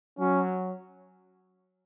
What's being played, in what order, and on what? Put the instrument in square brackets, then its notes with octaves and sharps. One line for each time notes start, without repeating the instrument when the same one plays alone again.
[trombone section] F#3 [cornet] C#4